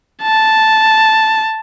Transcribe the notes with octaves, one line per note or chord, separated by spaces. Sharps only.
A5